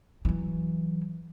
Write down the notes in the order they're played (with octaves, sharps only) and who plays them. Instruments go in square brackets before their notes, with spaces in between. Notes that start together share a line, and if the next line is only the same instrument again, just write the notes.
[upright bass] E3 F#3